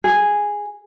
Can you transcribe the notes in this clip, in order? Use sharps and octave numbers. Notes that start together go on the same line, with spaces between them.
G#4